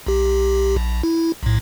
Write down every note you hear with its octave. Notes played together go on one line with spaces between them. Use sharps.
B1 G4
A#1
E4
B1 A2